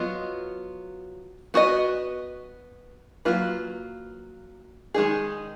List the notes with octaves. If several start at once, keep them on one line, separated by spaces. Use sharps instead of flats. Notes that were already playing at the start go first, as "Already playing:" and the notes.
Already playing: F#3 B3 F4 D#5
B3 F#4 B4 D#5
F#3 A#3 F4 B4
D#3 G#3 D#4 G#4